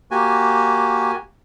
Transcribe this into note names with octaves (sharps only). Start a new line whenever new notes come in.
A#3 F#4 G4 G#5